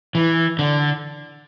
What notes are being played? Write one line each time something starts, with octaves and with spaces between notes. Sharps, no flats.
E3
D3